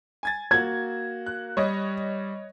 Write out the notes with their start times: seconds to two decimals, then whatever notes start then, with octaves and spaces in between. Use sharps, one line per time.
0.23 G#5 G#6 A6
0.51 A#3 F#4 G#6
1.26 F#6
1.57 G3 C#5 D#5